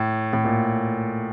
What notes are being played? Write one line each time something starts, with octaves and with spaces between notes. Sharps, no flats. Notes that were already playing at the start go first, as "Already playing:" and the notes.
Already playing: A2
A2
A#2